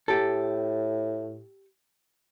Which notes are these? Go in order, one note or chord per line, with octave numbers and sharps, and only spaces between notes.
A2 G4 A4